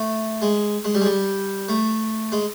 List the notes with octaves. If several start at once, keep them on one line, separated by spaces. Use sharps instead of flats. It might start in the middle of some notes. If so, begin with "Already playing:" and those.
Already playing: A3
G#3
G#3
G3
G#3
G3
A3
G#3